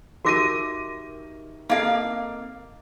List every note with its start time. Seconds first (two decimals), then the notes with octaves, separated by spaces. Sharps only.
0.25 D#3 F#4 G4 A#4 E5 D6 A#6 D#7
1.69 A#3 C4 D#4 A4 D#5 F5 F6